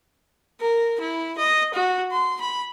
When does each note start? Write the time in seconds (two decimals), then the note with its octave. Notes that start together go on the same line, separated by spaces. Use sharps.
0.60 A#4
1.00 E4
1.38 D#5
1.74 F#4
2.12 C6
2.41 B5